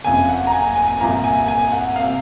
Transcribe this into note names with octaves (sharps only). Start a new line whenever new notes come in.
F#1 F2 C#3 G#5
F#5
A#5
G#5
G#5
G#5
C2 A#2 F3 A#5
G#5
G#5
F#5
C3 F5